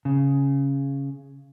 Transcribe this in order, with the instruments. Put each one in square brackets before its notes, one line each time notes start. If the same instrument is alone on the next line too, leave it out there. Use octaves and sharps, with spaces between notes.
[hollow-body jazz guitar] C#3